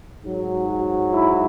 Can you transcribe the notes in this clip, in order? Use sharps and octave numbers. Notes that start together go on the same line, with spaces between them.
G#2 F#3
F#4
E4